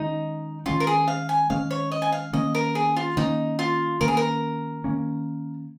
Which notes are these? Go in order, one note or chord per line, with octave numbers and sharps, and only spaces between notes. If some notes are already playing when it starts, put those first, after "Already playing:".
Already playing: D#3 G#3 C#4 D#4
D#3 G#3 C#4 F4
A#4
G#4
F5
G#5
D#3 G#3 C#4 F5
C#5
D#5
G#5
F5
D#3 A#3 C#4 D#5
A#4
G#4
F4
D#3 A#3 C#4 D#4
F4
D#3 A#3 C#4 A#4
G#4
A#4
D#3 A#3 C#4